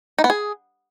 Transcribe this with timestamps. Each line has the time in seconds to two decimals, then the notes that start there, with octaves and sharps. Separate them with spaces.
0.19 D#4
0.24 B3
0.30 G#4